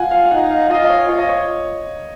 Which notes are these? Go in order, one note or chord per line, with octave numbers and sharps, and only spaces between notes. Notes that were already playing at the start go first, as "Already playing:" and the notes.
Already playing: F4 F#5 G#5
F5
F5
D#4 F#5
F5
F5
F4 D#5
D#5
C#5
F4 C#5
D#5
C#5